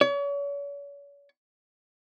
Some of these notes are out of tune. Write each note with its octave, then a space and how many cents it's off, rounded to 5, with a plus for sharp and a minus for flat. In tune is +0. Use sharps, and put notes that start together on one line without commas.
C#5 +40